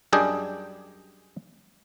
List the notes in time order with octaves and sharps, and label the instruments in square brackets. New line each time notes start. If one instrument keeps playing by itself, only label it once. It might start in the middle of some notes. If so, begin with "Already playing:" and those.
[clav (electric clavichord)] F#2 G3 D4 G#4 D#5 G5